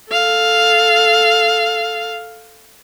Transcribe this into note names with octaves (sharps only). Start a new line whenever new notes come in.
A4 F5